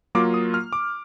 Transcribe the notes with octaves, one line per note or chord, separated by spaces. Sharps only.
F#3 A#3 F4 D6
D#6
F6
D6